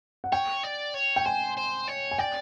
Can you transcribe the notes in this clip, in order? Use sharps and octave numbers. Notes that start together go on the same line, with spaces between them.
F#5
C#5 G5
D5
C#5
G5
C5 G#5
C5
C#5
G#5
D5 G5